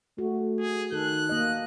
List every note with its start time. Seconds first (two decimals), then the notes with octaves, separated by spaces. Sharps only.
0.18 A3 F#4
0.60 G#4
0.92 D#3 A4 F#6
1.29 A#3 D#5